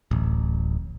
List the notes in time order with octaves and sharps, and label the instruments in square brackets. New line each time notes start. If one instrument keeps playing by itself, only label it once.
[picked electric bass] D1 A1